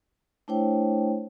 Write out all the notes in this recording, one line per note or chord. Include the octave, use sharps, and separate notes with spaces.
A3 D4 E4 C5 C#5 G5